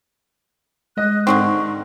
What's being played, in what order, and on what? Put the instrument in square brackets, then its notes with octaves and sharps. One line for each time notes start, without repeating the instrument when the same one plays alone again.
[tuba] G#3 [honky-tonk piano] D#5 [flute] F#6
[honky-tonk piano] G#2 [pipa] D3 D#3 C4 [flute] C#6